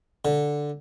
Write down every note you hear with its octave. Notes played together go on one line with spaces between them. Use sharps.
D3